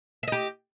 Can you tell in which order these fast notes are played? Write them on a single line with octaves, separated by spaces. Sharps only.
E5 D#5 G4